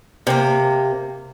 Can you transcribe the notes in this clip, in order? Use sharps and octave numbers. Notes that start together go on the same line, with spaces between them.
C3 A#3